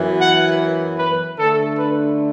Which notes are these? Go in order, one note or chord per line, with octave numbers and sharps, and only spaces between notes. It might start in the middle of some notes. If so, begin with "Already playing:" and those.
Already playing: F#2 E3 B3
F#5
B4
D3 A3 D4 A4
B4